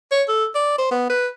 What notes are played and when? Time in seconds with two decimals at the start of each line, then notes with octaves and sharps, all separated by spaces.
0.11 C#5
0.28 A4
0.55 D5
0.78 C5
0.91 B3
1.09 B4